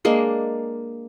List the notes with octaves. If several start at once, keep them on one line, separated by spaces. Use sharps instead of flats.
G#3 A#3 D4